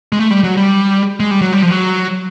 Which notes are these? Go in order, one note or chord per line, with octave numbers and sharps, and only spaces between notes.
G#3
A3
G3
F#3
G3
G#3
G3
F#3
G3
F3
F#3